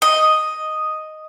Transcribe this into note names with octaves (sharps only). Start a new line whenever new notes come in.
D#5